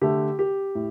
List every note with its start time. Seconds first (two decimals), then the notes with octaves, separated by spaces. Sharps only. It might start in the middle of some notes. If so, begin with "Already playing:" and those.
0.01 D3 A3 G4
0.39 G4
0.75 A2